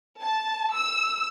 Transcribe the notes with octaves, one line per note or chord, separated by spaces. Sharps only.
A5
E6